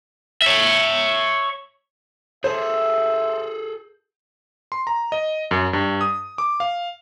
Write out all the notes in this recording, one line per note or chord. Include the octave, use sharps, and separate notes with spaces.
C#5 E5
G#4 A4 C5 E5
C6
A#5
D#5
F#2
G2
D#6
D6
F5